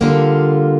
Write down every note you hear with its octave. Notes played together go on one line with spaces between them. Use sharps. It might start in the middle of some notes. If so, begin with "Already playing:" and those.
D3 G3 A#3 F4